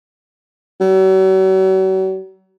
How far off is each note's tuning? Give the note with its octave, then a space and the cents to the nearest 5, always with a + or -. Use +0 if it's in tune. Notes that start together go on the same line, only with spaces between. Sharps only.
F#3 +40